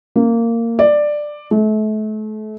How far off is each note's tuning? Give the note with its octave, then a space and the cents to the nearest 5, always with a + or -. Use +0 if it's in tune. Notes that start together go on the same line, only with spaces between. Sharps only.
A#3 -15
D5 +10
A3 -35